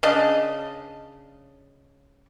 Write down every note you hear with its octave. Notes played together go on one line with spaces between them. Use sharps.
C#3 D4 D#5